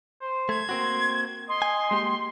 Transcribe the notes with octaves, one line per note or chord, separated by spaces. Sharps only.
C5
A3 G#6
A#3 C4 F#4 C6
D#5 C6
G#5
G#3 A#3 G4